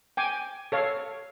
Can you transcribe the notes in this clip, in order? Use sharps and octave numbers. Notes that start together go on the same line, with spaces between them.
G5 G#5 D6
A4 C#5 F5